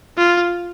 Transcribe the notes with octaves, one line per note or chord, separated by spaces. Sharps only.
F4